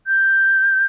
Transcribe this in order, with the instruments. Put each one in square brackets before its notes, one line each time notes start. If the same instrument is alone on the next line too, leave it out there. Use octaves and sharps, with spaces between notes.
[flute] G6